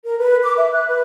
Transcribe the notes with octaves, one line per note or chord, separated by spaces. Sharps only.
A#4
B4
D6
E5
F#6
B4